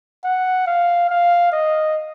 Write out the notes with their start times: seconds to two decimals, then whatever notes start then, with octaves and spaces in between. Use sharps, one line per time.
0.24 F#5
0.67 F5
1.10 F5
1.52 D#5